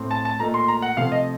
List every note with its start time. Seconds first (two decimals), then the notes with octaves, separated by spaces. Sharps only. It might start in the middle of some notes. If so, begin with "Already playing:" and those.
Already playing: A2 A3 C4
0.11 A5
0.25 A5
0.39 A#2 A3 D#4 A#5
0.54 C6
0.68 A#5
0.82 F#5
0.97 C3 F3 A3 F5
1.12 D#5